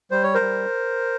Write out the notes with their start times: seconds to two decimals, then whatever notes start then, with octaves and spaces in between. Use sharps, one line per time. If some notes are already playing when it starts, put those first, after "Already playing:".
0.11 G3 C5
0.23 C#5
0.34 A#4 C5
0.41 G3